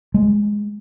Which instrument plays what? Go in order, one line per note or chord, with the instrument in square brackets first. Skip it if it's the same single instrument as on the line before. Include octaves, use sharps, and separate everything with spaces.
[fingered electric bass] G#3